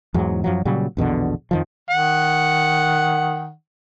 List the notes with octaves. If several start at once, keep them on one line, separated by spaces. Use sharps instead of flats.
E2 G#2 F#3
F#2 F3 F#3
A#2 C#3 F#3 G3
A#1 E2 B2 D3
F2 D#3 F3
D#3 F#5